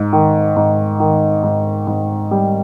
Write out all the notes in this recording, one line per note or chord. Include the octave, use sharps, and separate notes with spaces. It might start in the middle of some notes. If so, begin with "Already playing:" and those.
Already playing: G#2
D#3
G#2
D#3
G#2
G#2
G3